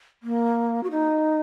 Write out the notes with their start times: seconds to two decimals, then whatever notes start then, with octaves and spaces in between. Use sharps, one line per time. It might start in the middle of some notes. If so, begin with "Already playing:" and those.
0.23 A#3
0.83 F#4
0.91 D#4